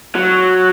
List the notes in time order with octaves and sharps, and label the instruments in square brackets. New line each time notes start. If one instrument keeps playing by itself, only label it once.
[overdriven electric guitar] F#3